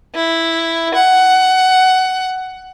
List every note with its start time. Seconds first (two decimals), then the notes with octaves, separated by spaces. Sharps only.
0.15 E4
0.95 F#5